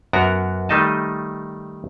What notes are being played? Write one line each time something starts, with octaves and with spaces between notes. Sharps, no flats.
F#2 B3 F#4 A#4 A#5
D#3 G3 A3 D#4 D#5 A5